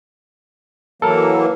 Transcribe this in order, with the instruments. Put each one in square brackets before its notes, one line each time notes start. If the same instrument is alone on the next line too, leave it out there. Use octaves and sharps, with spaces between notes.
[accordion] E3 F#3 A#3 [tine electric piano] A4 A#4